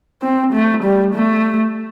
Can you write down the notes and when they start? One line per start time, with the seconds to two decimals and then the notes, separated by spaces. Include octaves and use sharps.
0.23 C4
0.53 A3
0.83 G3
1.14 A3